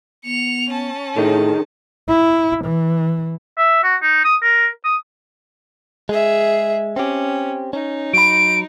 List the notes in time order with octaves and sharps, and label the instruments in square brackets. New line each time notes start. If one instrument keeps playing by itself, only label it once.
[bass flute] B3 [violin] C#7 F7
[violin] C#4 A5
[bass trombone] A2 [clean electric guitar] D3 D#3 D#4 [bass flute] G#4
[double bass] E4
E3
[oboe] E5
F#4
D#4
D#6
A#4
D#6
[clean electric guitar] G#3 [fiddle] G#4 E5
[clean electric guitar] C4 G4 [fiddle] C#4
[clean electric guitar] C#4 [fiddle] D#4
[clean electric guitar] F#3 B5 [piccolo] D7